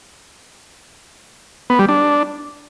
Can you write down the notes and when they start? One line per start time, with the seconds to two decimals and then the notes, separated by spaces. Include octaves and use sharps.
1.70 B3
1.79 G3
1.89 D4